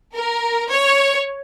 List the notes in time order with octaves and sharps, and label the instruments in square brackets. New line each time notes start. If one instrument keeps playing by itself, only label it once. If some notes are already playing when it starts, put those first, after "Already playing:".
[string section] A#4
C#5